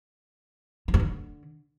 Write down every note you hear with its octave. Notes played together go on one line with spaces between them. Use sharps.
E3
G2
D3